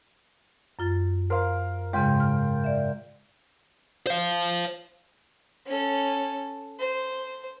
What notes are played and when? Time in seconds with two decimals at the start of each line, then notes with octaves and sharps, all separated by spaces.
0.79 F#2 F4 A6
1.30 A#4 C5 F5 C6
1.93 G#2 C#3 G#3 F4 G5
2.20 F6
2.64 D5 E5
4.07 C5 F5
5.67 C#4 A4
6.79 C5